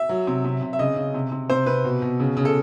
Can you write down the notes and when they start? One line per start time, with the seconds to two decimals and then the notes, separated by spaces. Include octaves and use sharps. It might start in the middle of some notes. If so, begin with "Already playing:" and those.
Already playing: E5
0.09 F#3
0.27 C3
0.44 C3
0.62 C3
0.73 E5
0.79 C#3 D#5
0.97 C#3
1.15 C3
1.32 C3
1.50 C3 C5
1.66 C3 B4
1.85 B2
2.02 B2
2.20 C#3
2.37 C#3
2.45 A4